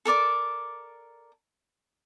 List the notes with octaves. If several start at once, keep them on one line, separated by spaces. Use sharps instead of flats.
A4 A#4 D5 D6